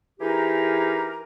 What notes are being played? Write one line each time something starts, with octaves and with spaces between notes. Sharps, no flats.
E3 D#4 G4 G#4 A#4